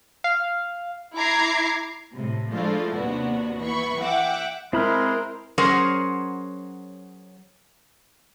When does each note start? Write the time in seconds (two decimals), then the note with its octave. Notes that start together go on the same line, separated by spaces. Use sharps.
0.24 F5
1.16 E4 A#5 D6 G#6 C7
2.13 A2 C3
2.52 F3 G#3 A3 D4 E4 F4
2.95 D#2 C3 B3 D4 F#4
3.61 E3 B3 B5 C#6
4.00 E5 F#5 G5 D6
4.73 G#3 C4 E4 A#4 C5 B5 F6
5.58 F#3 C#4 G#4 A#4 C5 F#5